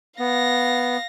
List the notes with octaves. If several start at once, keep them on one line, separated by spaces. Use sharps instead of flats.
B3 F5 A#6